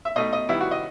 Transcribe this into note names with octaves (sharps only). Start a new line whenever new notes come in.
E5
B2 A3 D#4 D#5
D#5
D#3 G3 B3 E4
F#4
D#5